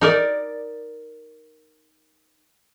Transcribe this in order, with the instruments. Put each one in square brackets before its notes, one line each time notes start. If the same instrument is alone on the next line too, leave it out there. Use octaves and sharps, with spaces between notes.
[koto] D#4 A#4 D5